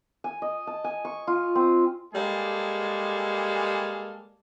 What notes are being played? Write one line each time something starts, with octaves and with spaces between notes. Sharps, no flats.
G#5
D#5
A5
G#5
C#6
F4
C4
G3 G#3 A#3 G#4 A4